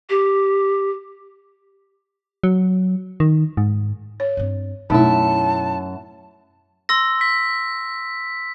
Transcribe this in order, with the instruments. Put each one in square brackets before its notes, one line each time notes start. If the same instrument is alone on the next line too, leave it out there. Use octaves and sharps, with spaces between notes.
[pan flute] G4
[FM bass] F#3
D#3
G#2
[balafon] C#5
[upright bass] G2 C4
[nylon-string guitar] F#2 E4 [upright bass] B2 [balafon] A3 D#4 [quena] A5
[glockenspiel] C6 E6 A#6
[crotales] B6